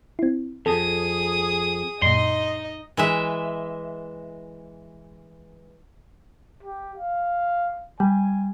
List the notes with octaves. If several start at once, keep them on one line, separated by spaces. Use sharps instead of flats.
C4 E4
F2 G#4 A4 D#6
F#2 A#2 D#4 D#5 C6
E3 G#3 E5
G4
F5
G3 G#5